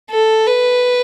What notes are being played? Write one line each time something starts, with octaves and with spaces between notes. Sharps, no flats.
A4
B4